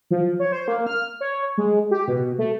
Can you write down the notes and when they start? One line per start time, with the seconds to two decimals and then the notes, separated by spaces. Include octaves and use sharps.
0.11 F3
0.40 C#5
0.52 C5
0.68 A#3
0.87 F6
1.21 C#5
1.58 G#3
1.91 G4
2.08 B2
2.39 A3